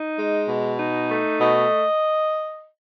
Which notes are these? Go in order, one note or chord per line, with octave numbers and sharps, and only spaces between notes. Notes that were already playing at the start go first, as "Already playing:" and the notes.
Already playing: D#4
G#3
B2
D#4
A3
B2 D#5